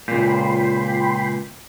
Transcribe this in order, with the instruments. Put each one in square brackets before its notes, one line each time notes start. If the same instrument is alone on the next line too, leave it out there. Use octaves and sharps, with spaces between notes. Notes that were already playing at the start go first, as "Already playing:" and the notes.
[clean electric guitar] C#2 A#2 [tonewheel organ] G5 B5 C6